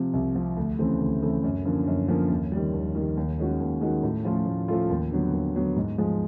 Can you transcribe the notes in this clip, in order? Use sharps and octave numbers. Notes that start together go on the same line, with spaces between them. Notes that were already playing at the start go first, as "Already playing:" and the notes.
Already playing: C3 F3
C2
C3 F3
D2
C#3 E3 A3 C4
D2
C#3 E3 A3 C4
F#2
D3 F3 A#3 C#4
F#2
D3 F3 A#3 C#4
D#2
D#3 G3
D#2
D#3 G3
D#2
D#3 G#3 C#4 F#4
D#2
D#3 G#3 C#4 F#4
A2
F3 A3 C#4 F4
A2
F3 A3 C#4 F4
D#2
D3 F#3 B3
D#2
D3 F#3 B3
G#2
F3 G#3